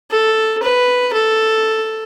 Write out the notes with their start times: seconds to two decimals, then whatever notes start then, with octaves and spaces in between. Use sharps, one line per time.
0.11 A4
0.63 B4
1.13 A4